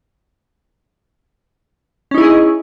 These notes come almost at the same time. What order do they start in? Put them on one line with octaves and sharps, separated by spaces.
C#4 D#4 E4 G#4 D#5